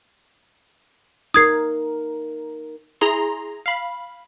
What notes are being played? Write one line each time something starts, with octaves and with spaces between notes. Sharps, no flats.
D#4 A#4 D#6 G#6 C7
E4 G#4 A#5 C6
F5 B5